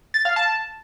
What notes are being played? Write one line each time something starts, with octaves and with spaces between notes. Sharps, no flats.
A6
F5
A5